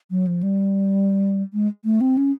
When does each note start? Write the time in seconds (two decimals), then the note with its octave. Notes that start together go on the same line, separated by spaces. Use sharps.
0.11 F#3
0.27 F3
0.43 G3
1.53 G#3
1.85 A3
2.01 C4
2.17 C#4